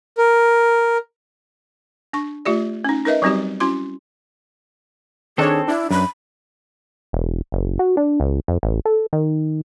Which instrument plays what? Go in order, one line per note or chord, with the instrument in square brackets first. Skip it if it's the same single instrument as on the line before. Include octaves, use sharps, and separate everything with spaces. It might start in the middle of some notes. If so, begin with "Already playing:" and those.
[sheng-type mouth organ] A#4
[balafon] D4 C#6
A3 F4 G4 D5
C#4 D#4
D#4 A#4 B4 D#5 E5
F#3 G3 C4 D#4 F#4 G4
C#4 E4 F#4 C6
[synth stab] D#3 D4 C#5 [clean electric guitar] C4 A4 [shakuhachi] G#4
[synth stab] D4 [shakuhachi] E4
[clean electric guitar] F#2 [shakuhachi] B5
[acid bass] E1
F#1
F#4
D4
C#2
F2
A1
A4
D#3